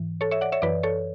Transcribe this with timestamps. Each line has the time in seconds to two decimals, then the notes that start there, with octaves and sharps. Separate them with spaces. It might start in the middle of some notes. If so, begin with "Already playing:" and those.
Already playing: G#2 E3
0.21 A4 C#5
0.31 C#5 E5
0.41 D5 F#5
0.52 C#5 E5
0.62 F#2 E3 B4 D5
0.83 A4 C#5